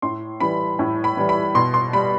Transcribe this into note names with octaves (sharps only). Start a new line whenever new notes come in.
A2 C6
E3 G3 B5
A2
B5
E3 G3
B5
B2 C6
C6
G3 B5